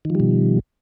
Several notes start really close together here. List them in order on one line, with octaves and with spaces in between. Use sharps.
D#3 F3 G3 B2